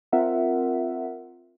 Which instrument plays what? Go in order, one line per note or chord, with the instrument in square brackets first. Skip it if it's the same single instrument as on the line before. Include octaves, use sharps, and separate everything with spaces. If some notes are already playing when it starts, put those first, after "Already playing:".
[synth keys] C4 F4 A#4 E5 F#5